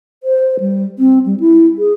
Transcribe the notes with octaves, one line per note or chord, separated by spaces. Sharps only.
C5
G3
C4
G3
E4
G#4